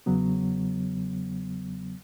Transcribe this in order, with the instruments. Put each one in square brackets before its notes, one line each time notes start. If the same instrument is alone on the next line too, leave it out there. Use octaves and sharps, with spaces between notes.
[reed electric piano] E2 C#3 F#3 B3